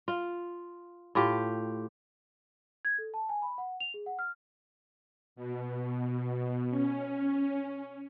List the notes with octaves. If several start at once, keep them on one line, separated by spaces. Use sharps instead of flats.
F4
A2 F4 G4
G#6
A4
A5
G#5
B5
F#5
F7
G#4
F#5
F6
B2
C#4